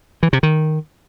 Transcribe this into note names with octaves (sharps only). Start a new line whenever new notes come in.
E3
C3
D#3